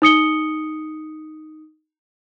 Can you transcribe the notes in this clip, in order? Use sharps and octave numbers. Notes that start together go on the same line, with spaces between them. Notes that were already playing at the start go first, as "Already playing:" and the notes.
D#4 D#6 C#7 G7